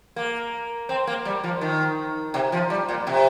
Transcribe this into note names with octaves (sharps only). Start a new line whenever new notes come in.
A#3
C4
A#3
G3
F3
D#3
C3
F3
G3
A#2
C3